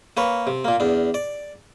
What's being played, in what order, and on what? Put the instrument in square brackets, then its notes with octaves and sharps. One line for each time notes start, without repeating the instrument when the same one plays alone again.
[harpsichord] A#3 B4 C#5
C3
A#2 A#3
E2 D4
D5